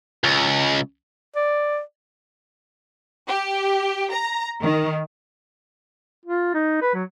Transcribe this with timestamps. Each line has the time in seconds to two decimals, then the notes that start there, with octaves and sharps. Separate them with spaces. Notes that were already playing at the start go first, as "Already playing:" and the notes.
0.24 C#2
1.36 D5
3.29 G4
4.13 A#5
4.62 D#3
6.25 F4
6.54 D#4
6.81 B4
6.94 F#3